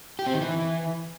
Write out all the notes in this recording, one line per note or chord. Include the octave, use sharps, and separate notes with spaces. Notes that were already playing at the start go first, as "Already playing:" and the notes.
G4
C4
D#3
E3